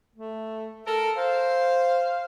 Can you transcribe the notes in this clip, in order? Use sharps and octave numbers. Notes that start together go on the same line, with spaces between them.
A3
A4 A#4
C5 F5